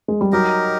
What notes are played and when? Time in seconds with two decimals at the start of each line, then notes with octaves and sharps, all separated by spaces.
0.08 G#3
0.21 G3
0.32 F#3 D#4 G4 A#4 D#5